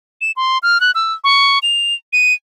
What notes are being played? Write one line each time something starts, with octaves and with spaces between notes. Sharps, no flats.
E7
C6
F6
F#6
E6
C#6
F7
D#7